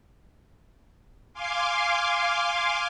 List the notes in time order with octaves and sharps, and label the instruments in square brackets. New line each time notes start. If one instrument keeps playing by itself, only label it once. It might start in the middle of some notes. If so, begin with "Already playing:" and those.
[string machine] F5 G#5 C6 D6